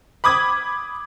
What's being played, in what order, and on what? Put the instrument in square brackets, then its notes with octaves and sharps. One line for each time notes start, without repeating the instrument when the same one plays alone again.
[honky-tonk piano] B5 D6 D#6 G#6